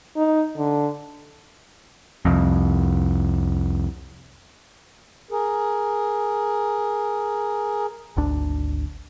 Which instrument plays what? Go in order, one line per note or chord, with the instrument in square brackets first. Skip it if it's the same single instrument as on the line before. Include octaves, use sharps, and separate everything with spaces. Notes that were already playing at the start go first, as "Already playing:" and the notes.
[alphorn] D#4
D3
[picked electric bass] C2 F2
[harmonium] G#4 A#4
[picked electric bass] G#1 D2 D4